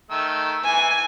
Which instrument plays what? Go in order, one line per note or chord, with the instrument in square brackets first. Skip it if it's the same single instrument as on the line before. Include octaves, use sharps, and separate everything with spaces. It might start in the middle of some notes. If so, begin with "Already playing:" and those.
[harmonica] D#3 A3 E6
[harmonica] E3 [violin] G#5